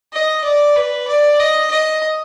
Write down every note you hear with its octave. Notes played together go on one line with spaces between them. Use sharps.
D#5
D5
B4
D5
D#5
D#5